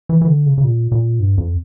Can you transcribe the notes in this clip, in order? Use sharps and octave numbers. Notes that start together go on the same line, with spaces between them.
E3
E3
D3
C#3
C#3
A#2
A#2
G2
F2